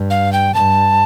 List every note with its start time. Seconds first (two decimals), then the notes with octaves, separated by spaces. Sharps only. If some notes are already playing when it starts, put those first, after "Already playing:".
Already playing: G2
0.10 F5
0.33 G5
0.54 G2 A5